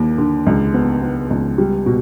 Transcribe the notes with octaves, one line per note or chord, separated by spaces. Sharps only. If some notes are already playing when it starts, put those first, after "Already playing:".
Already playing: D#2 A#3
D3
C#2
B3
B3
C#2
G3
B2